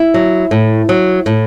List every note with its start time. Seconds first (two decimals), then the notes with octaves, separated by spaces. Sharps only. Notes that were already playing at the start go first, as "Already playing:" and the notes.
Already playing: E4
0.14 F#3
0.51 A2
0.89 F#3
1.26 A2